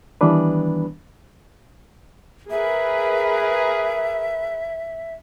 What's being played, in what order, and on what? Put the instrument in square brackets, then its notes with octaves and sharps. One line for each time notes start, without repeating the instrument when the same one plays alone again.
[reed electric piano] D#3 E3 G3 B3 D4 B4
[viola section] G#4 A#4 B4 [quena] E5